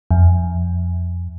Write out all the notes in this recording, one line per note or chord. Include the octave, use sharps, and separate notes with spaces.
F2